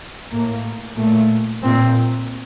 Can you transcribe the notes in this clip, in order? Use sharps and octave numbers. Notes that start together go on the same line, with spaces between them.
A2 A#3
A#2 A3
A#2 C4